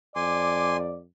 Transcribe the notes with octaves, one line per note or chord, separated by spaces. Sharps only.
F2 D5 G#5 C6 D6